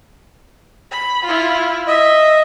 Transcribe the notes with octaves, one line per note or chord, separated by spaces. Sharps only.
B5
E4 F4
D#5 E5